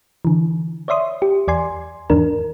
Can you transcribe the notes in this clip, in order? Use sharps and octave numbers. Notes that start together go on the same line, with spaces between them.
D3 E3
C#5 D5 E5 C6 D#6
G4
E2 D5 G#5 C6
E2 G#2 D#3 D4 A#4